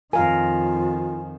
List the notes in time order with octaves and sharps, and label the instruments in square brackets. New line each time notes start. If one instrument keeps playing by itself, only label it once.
[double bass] F2 D#3 [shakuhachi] F4 [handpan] A#4 F5 [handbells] G#5